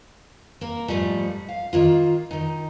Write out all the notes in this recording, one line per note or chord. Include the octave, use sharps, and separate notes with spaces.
A#3 A#4
G#2 B2 F3 G3 A3
F5
D#3 A#3 F4
D#3 D#4